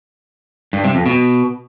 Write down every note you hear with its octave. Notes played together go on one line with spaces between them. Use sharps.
G2
C3
F2
B2